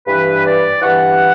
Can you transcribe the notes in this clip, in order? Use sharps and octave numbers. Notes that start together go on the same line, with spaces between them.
G2 E3 B4
D5
G2 E3 F#5